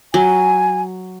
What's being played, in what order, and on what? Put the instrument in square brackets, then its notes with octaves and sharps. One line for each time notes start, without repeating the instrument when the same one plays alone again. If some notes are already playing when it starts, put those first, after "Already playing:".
[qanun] F#3 [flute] G#5